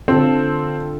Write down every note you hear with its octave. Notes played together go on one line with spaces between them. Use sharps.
D3 C4 F4 A4